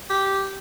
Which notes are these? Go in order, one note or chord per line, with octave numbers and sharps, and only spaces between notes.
G4